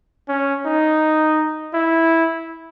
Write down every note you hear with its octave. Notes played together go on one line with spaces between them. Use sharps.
C#4
D#4
E4